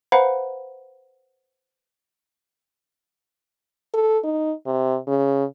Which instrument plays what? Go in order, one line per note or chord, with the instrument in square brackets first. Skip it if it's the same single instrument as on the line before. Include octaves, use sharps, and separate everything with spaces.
[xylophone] B4 C5 F5 F#5 A#5 B5
[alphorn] A4
D#4
C3
C#3